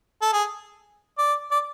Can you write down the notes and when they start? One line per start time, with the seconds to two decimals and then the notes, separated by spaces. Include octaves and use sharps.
0.22 A4
0.33 G#4
1.18 D5
1.51 D5